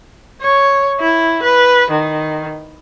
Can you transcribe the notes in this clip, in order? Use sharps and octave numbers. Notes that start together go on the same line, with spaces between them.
C#5
E4
B4
D#3